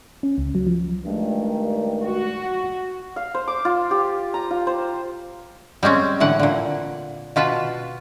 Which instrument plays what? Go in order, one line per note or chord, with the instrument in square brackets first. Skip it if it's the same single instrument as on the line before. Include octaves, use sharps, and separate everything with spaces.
[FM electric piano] C#4
C#2
F#3
F3
[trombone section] G2 A#2 D#3 [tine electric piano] G#3 A3 D4
[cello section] F#4
[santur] F5
C5
D6
F4
G4
A#5
F4
C5
[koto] G3 G#3 C4 C#4
A2 D3 E3 F#5
A#2 D3
B2 F4 B4 A5